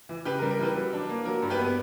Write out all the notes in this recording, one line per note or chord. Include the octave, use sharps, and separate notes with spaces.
E3
C#3 G4 B4
A#4
G3
A#4
E3 G4 B4
F#3
D4
A#3
F#3 A#4
G2
G4 B4
B3